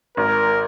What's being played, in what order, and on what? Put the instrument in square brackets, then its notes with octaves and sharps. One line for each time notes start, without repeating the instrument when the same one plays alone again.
[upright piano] G#1 [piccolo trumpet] A#4